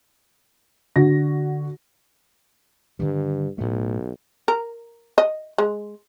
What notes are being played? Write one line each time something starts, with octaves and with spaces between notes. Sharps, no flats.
D3 F#4 A#6
G2 D3 D#3 G3
B1 A2 A3
A#4
D#5
G#3